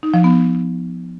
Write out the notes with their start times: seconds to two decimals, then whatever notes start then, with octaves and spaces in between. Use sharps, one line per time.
0.03 D#4
0.14 F3
0.24 B3